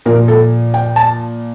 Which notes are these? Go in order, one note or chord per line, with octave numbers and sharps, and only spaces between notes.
A#2 F3 A#4
A4
G5
A5